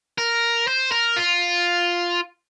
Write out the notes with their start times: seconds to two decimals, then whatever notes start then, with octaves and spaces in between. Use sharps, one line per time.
0.18 A#4
0.68 C5
0.92 A#4
1.16 F4